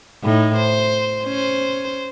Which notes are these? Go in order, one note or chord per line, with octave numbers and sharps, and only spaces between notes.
A2 D#4
C5
C#4 C5